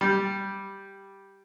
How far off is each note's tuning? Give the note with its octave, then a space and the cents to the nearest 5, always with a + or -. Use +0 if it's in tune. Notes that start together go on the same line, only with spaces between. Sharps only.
G3 +0